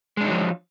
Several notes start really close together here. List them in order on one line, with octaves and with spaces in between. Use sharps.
G#3 D4 D#4 F#3 F3